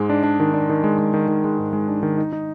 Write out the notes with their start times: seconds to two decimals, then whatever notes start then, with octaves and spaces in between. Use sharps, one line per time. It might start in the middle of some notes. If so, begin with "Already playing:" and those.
Already playing: G#2 G#3
0.10 D4
0.24 D4
0.40 D#3
0.54 D4
0.70 D#3
0.84 G#3
0.99 G#3
1.14 D#3
1.28 D#3
1.44 G#3
1.59 G#2
1.73 G#3
1.88 D4
2.03 D#3
2.18 D#4
2.33 D#4